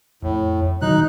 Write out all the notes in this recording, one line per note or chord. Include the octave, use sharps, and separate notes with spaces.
F2 A2
B2 D#3 F#3 D#4 F#6